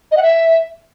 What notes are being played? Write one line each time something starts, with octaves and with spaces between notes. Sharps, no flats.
D#5
F#5
E5